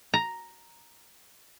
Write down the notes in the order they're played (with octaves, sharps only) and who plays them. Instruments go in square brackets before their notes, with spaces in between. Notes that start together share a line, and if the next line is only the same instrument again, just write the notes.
[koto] A#5